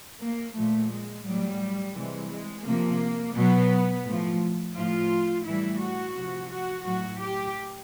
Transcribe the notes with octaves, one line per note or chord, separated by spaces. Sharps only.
A#3
A#2 F3 A3
G#3
A2 F#3 G3
C3 E3 G3 G#3
G#3
C3 F3 A#3
B2 F#3 B3
A2 F3
A2 F3 F4
A2 E3 G3 E4
F#4
C3 F3
F#4
A2 F#3 F#4
G4